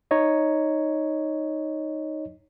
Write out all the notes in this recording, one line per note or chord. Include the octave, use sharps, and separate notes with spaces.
D#4 C#5 D#5